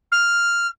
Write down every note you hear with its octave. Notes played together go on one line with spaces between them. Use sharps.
F6